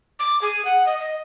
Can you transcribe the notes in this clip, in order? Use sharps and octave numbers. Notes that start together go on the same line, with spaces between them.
D6
G#4
F#5
D#5
D#5